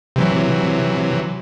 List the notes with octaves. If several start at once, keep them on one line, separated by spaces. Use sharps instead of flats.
C3 E3 F#3